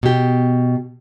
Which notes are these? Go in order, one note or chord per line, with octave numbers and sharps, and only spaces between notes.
B2 G4